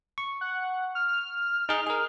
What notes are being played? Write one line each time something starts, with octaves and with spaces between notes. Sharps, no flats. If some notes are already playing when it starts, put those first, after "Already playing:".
C#6
F#5
F6
D#4 G#4
G#4 A#4